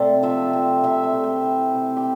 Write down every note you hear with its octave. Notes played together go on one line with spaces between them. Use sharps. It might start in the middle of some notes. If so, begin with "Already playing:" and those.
Already playing: C3 A3 D5
F3 E5
C3
C3 E5
E5
A3
G4
E3
C3
G4